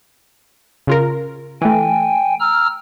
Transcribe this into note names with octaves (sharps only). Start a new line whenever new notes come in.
C#3 F4 A#4
E3 A3 G5 G#5
A#5 E6 F6